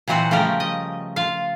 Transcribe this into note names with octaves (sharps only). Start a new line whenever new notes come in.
A#2 E3 F#3 C4 F#4
C#3 F3 G3 A3 G4 A#4
D#5
F4 F5